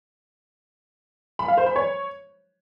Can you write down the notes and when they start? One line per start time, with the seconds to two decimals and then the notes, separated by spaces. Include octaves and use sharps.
1.39 B5
1.48 F5
1.57 C5
1.67 B5
1.76 C#5